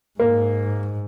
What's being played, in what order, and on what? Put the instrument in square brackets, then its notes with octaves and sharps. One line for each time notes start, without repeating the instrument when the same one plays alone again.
[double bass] G#2 [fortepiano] A#3